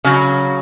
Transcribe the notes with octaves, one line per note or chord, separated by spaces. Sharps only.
C#3 F#3